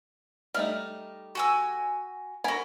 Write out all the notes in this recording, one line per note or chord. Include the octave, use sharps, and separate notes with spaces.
G3 A3 D#4 F6
F#4 G#5 E6
F#4 A#4 G#5 B5